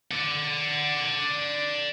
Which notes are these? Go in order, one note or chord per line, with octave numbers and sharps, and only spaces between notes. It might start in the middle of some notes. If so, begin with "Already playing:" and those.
D5 F#5